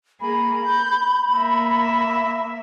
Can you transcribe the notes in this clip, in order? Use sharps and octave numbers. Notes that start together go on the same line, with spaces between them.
A#3 G#4 B5
G6
A#3 E5